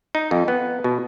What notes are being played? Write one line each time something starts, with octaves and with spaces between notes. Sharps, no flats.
D#4
F2
B3
B2